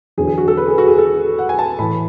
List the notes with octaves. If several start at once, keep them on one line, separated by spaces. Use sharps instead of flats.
E2 D3 F#3 G#4
G#4
F#4
A4
B4
G#4
F#4
G#4
A4
F#5
G#5
A5
A2 E3 B5